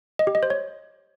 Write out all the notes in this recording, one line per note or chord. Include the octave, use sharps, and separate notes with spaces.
D#5
G4
D#5
C5
C#5